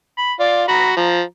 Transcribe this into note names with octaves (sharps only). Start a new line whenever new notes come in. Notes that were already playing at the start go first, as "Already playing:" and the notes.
B5
F4 D5
F#4 A#5 B5
F3 A#5